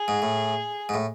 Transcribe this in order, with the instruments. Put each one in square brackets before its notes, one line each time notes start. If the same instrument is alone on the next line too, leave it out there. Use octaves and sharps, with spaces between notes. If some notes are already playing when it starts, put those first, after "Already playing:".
Already playing: [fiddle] G#4
[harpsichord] G#2
A2
G#2
A2